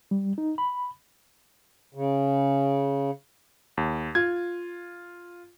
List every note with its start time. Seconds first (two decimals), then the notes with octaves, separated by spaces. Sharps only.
0.11 G3
0.38 D#4
0.58 B5
1.95 C#3
3.77 D#2
4.15 F4 G#6